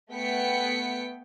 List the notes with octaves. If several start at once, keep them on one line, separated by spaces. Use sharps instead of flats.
A3 B3 G5 B6 C#7